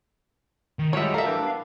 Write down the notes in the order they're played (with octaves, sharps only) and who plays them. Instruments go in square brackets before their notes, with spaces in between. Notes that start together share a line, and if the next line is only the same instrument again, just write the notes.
[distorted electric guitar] D#3
[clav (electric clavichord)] D2 F3 F#4 [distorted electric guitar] G3 [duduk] G#3 [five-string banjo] C#5 E5
[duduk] A4 [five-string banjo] A#4 E5 [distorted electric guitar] F5
[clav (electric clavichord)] A1 E3 G3 [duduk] D4
[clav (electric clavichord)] B3